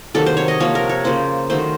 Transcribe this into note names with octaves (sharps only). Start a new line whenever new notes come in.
C3 D#3 F#3 A#3 A4
C5
C#5
D#5
C3 F3 A#3 C#5
A#4
C#5
C#3 F3 A#3 C5
D#3 F#3 A3 C5